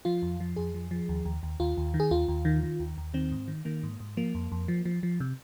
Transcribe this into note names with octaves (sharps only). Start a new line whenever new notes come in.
F3 F4
F2
F3
F2 G#4
F3
F3
D#2
D#2
D#2
D#2 F4
D#2
D#3
G#4
D#2 F4
D#2
D#3
D#3
D#2
D#2
D#3 C4
G#2
D#3
D#3 A#3
G#2
G#2
F3 A#3
F2
F2
F3
F3
F3
C3